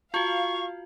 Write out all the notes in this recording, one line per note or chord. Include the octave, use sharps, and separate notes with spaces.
F4 F#4 F5 C#6